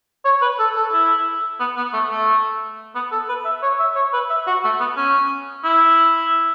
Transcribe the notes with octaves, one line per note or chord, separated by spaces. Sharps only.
C#5
B4
A4
A4
E4
B3
B3
A3
A3
B3
A4
B4
E5
C#5
E5
C#5
B4
E5
F#4
A3
B3
C#4
E4